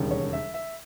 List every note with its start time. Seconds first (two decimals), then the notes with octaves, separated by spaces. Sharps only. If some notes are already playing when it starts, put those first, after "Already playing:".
Already playing: E1 D#2 C#3 G3
0.11 C#5
0.33 E5
0.54 E5